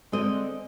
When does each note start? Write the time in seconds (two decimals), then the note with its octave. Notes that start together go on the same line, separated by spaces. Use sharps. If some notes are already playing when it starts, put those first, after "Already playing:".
0.12 D3 G#3 C4 D#5